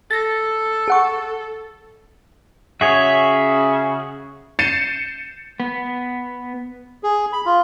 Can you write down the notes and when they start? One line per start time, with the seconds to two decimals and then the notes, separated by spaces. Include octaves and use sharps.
0.11 A4 A6 A#6
0.88 G#4 F#5 C#6
2.81 C#3 F#4 G#4 C#5 E5
4.59 G6 A6 C7 C#7 D#7 E7
5.60 B3
7.03 G#4
7.33 B5
7.46 F4